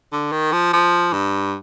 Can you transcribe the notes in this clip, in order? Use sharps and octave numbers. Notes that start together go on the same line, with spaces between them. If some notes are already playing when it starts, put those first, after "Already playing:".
D3
D#3
F3
F3
G2